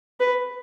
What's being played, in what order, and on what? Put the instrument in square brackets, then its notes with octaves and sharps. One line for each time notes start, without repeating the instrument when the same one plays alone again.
[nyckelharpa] B4